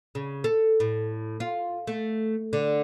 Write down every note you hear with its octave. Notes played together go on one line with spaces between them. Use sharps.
C#3
A4
A2
F4
A3
D3